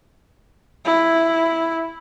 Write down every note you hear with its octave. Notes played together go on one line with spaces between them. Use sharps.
E4